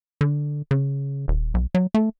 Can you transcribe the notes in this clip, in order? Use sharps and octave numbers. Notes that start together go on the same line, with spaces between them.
D3
C#3
D#1
B1
F#3
A3